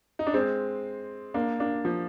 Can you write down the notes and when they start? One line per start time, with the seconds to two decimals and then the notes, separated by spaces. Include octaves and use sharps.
0.19 D#4
0.27 D4
0.34 G#3 C4
1.34 A#3 D4
1.60 A#3 D4
1.85 F3